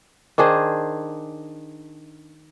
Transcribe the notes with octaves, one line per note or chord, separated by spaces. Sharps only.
D#3 D4 G#4 C5